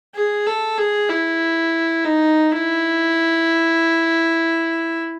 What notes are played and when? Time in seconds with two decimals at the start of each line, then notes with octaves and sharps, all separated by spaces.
0.15 G#4
0.46 A4
0.77 G#4
1.09 E4
2.04 D#4
2.52 E4